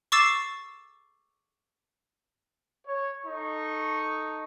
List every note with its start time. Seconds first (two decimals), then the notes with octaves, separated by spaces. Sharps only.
0.12 C#6 D6 E6 A6 C7 E7
2.86 C#5
3.26 D#4 A4 C#6